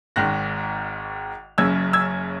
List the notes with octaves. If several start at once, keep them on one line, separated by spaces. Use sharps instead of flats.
G#1 G#2 D#3 F#6 A#6
F#1 F#2 C#3 E6 G#6
E6 G#6